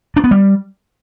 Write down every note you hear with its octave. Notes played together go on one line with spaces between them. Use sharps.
D4
B3
G3